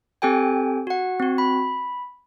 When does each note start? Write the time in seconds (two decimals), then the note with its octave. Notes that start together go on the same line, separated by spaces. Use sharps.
0.22 C4 G4 A4 G5 G#5
0.87 F#4 F#5
1.20 C4 F#4
1.38 B5